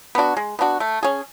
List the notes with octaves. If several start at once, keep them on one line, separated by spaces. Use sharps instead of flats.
B3 D4 F#4
G#3
B3 D4 F#4
A3
C#4 G#4